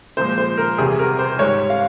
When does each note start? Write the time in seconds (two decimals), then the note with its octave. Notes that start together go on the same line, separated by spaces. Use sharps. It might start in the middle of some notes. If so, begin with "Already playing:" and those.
0.17 A#2 F3 G#3 C5
0.38 C5
0.57 A#4
0.78 E2 C3 G3 G#4
0.99 A#4
1.19 C5
1.39 G#2 G3 C#5
1.70 F5